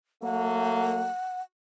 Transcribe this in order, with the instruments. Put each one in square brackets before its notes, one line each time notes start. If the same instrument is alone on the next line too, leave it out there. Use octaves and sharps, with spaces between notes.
[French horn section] F#3 A3 A#3 [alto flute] F#5